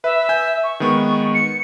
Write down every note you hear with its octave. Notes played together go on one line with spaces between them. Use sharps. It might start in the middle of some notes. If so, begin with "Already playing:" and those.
B4 E5
G#5 G6
C#6
D#3 G#3 B3
C#7